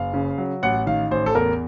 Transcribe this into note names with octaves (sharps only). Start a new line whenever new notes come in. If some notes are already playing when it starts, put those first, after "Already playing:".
Already playing: F#1 F5
C#3
F#3
A1 F#5
D#3 F5
A1 C5
A4
E2 A#4